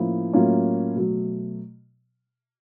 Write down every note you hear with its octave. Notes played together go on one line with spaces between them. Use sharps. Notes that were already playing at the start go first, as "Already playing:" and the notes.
Already playing: A2 F3 A#3 C#4 E4
A2 F#3 A#3 C#4 F4
B2 F#3 A3